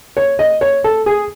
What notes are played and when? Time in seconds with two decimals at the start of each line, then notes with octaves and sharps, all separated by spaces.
0.17 C#5
0.39 D#5
0.61 C#5
0.84 A4
1.06 G#4